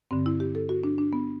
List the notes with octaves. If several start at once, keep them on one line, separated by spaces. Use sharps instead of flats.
G2 D3 C4
E4
G4
A4
F#4
D4
D4
B3